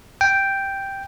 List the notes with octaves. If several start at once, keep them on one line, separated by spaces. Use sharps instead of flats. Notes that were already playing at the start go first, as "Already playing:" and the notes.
G5